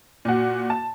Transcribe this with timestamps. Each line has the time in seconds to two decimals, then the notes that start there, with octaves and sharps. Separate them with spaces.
0.25 A#2 F#4
0.70 A5